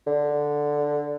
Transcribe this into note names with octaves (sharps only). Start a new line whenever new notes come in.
D3